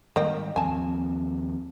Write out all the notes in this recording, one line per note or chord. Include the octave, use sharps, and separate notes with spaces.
G#2 D#3 G3 A#3 D#5 G5
D#2 F3 C4 G#5 A5